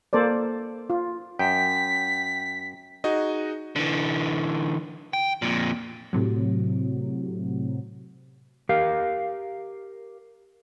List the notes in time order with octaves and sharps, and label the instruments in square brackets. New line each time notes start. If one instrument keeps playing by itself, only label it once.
[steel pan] A#3 A4 C5 D5
F4
[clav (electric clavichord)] F#2 [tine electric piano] G5 [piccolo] B6
[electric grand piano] D#4 F#4 G#4 D#5
[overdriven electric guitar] D3 E3
G5
F2 A#2
[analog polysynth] A2 C3 F#3
[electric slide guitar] G4 A#4 F5